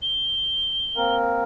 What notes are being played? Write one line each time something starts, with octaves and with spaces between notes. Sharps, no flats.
G7
A#3 C4 A#4